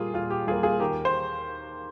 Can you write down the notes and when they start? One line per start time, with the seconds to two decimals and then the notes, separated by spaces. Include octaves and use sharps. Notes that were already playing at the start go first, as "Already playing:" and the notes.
Already playing: A#2 G3 A#3 F4 G#4
0.14 A#2 F4
0.30 G4
0.47 G3 A#3 F4 G#4
0.63 F4 G#4
0.80 D#2 G4 A#4
1.05 C5